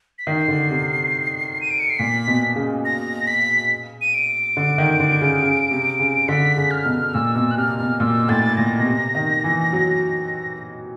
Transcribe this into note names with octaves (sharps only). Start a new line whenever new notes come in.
B6
D#3 C7
D3
C3
D#7
D7
C#7
C7
A#2 B6
B2
C#3
A#6
B6
D#7
D7
D3
D#3
D3
C#3
C#3
C3
C#3
D3 B6
C#3
F6
B2
A#2 E6
B2 E6
F#6
C3 F6
B2 F6
A#2 E6
A2 A6
A#2 A#6
B2
C3
D#3
E3
F#3